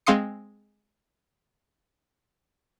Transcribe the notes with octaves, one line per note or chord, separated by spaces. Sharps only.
G#3 C4 F5 C6 D#6 C#7